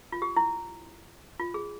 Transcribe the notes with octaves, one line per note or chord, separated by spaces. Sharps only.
F4
G4
E4
F4
G#4